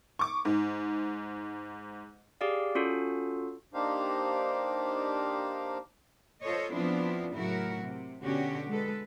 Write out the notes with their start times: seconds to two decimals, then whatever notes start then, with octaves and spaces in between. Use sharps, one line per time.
0.19 C#6 D6
0.45 G#2
2.41 G4 G#4 D5 F5
2.75 C#4 F4 F#4 A4
3.74 A#3 D4 D#4 G4 C5 F5
6.42 F4 A4 C5 C#5 D#5
6.72 F3 B3 C4 D4 E4 F4
7.33 A2 C#3 F#3 E4 F#4 A#4
7.82 C3
8.22 B2 D3 C#4 F#4 G4
8.69 G#3 A4 B4